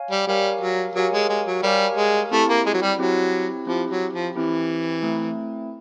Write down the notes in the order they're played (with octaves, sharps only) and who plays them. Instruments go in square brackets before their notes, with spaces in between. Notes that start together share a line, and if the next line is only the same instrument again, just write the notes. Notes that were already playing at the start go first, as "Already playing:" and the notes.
Already playing: [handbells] C#5 F5 G#5
[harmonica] G3
[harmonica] G3 [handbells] G4 A#4 C#5 F5 G#5
[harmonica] F#3
[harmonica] F#3 [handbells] G4 A#4 C#5 F5 G#5
[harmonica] G#3
G#3
F#3
[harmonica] G3 [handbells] G4 A#4 C#5 F5 G#5
[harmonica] G#3
[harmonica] A3 [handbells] C4 E4 G4
[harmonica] A#3
G#3
F#3
G3
[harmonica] F#3 [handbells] C4 E4 G4
[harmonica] F3 [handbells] C4 E4 G4
[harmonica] F#3
F3
[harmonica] E3 [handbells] C4 E4 G4
[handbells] A3 C4 E4